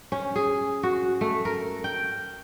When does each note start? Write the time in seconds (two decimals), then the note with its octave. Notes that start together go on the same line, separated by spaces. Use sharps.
0.12 C#4
0.36 G#4
0.83 F#4
1.21 A3
1.45 A#4
1.84 G5